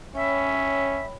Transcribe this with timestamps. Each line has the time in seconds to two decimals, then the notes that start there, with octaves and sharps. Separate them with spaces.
0.15 C#4 C#5 E5 G5 B5